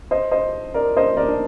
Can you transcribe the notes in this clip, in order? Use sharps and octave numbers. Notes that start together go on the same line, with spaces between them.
C5 D#5
C5 D#5
A#4 D5
C5 D#5
A#4 D5
D4